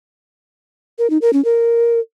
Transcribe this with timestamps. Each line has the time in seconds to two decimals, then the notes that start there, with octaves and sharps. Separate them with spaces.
0.99 A#4
1.10 D#4
1.22 A#4
1.33 C#4
1.45 A#4